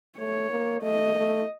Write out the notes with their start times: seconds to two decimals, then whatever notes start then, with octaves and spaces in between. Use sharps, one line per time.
0.18 A3 C#5
0.50 A#3
0.82 A3 D#5
1.15 A3